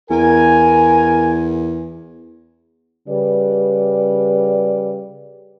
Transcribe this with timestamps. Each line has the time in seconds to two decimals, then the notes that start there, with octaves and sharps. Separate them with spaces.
0.10 E2 A#4 G#5
3.08 C#3 G3 B4 D5